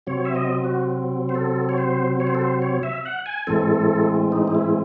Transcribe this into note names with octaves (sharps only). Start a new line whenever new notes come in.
C3 F#3 C4 C#5
E5
D#5
F#4
C5
A4
C#5
C5
C#5
C5
A4
C5
C#5
E5
F#5
G#5
A2 E3 G#3 C4 A4
D#4
D#4
E4